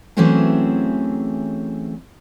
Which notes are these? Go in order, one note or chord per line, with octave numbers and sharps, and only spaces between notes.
E3 F#3 A3 C4 C#4 G#4